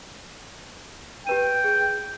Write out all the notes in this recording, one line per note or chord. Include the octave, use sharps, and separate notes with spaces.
G4 B4 G5 D#7
G#4